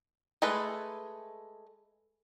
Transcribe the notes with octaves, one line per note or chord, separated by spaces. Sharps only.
G#3 A3 G#4 A4 B4